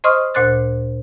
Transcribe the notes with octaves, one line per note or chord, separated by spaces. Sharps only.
C5 D#5 C6 C#6 D#6 F6
D2 A#2 C5 C6 F#6 A6